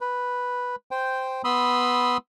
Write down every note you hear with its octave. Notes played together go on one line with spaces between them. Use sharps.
B4
C5 G5
B3 B5 C6 D#6 E6